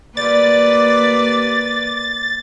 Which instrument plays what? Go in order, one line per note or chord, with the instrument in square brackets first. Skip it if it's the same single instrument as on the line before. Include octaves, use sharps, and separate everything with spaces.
[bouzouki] G3 F4 [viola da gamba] A#3 B4 D5 [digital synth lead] A6